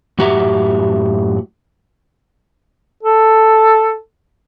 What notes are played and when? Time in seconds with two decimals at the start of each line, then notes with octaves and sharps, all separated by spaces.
0.18 F#2 A2 F#4 G4 E5 A#5
3.03 A4